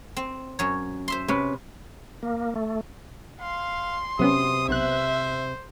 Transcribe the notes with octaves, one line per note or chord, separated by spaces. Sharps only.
C4
F#2 C#5
C5 E5 C6
C3 C#4 B4
A#3
A3
F5 C6
C3 F#3 B3 C#4 D#6
B1 B3 C5 E5 F#6